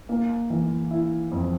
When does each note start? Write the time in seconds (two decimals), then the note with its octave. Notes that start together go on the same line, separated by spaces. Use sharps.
0.09 A#3
0.50 E3
0.91 E4
1.31 F2